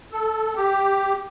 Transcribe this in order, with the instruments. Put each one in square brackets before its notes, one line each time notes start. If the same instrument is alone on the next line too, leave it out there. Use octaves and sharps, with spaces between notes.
[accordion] A4
[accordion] G4 [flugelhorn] G5